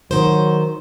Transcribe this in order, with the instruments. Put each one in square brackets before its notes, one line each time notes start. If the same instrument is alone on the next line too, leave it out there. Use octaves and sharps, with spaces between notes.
[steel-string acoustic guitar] D#3 C5 [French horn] F#3